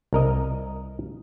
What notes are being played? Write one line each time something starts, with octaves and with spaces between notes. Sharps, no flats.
C2 A#4 D#5